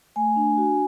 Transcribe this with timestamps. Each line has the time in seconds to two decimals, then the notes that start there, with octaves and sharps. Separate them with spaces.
0.16 A3 G#5
0.36 D4
0.57 F#4